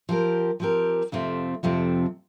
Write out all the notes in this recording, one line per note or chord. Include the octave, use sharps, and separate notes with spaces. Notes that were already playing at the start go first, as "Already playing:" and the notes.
F3 C4 G4 A#4
F3 C4 G4 A#4
F2 C3 F3 A3 C4
F2 C3 F3 A3 C4